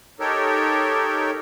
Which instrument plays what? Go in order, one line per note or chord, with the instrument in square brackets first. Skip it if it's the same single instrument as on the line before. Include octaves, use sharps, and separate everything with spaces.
[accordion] D#4 G4 A4 A#4 C#5